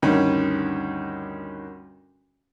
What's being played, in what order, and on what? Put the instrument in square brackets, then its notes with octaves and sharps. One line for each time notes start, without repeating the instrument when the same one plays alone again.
[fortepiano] D2 G2 D#3 C#4